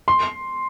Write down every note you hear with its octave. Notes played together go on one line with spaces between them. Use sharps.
C6